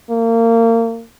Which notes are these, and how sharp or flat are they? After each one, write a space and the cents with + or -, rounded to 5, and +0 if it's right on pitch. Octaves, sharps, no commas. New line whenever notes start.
A#3 -30